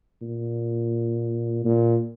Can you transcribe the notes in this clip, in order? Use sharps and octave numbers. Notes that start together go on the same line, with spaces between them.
A#2
A#2